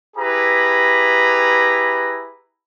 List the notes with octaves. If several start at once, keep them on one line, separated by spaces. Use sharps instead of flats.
E4 G4 G#4 B4 A#5 B5